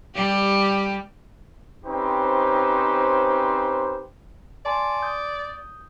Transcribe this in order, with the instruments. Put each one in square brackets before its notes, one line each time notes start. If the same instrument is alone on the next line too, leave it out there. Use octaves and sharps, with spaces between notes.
[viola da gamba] G3 G4
[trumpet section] C4 C#4 D#4 G4 B4 C5
[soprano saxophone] D5 [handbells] G#5 A5 C6
[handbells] D#6 G6